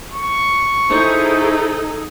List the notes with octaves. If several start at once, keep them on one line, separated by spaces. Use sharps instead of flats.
C#6
D#4 E4 G#4 A4 C5